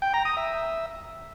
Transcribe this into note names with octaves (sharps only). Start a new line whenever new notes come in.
G5
A#5
D#6
E5